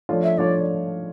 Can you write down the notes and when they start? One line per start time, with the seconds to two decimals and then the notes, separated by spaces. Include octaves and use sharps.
0.09 F3 A3 D4 F4 C#5
0.23 E5
0.38 F3 A3 D4 F4 C#5 D5